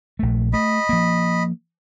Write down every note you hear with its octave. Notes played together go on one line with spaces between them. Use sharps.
A#1 A3
A3 D#5 B5
F3 A#3